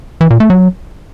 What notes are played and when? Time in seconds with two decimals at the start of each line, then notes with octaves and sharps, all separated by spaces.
0.21 E3
0.30 A#2
0.40 A3
0.50 F#3